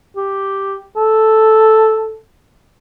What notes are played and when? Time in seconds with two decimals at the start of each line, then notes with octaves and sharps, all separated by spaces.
0.17 G4
0.97 A4